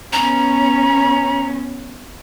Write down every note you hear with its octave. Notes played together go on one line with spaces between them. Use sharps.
B3 C#4 A#5